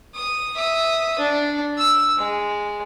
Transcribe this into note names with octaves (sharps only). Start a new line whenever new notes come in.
D#6
E5 D#6
D4
E6
G#3